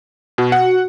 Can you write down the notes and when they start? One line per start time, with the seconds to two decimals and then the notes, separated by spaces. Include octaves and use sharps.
0.38 B2 F#4
0.52 F#5